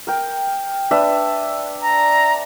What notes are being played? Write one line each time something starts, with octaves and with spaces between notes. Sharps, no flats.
A#4 G5
D4 B4 E5
A#5